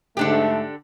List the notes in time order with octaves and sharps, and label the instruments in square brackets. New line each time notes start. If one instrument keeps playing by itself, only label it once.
[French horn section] G#2 A3 [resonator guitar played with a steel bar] D3 D4 G4